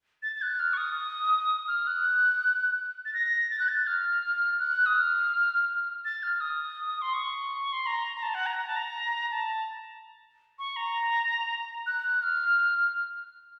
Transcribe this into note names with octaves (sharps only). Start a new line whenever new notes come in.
A6
A6
F#6
F6
C#6
D#6
F6
F#6
A6
A#6
A6
F#6
A6
F6
F#6
D#6
F6
A6
F6
D#6
C6
C#6
C#6
C6
A#5
A#5
A5
F#5
A#5
A#5
A5
A#5
A5
C#6
A#5
F#6
F6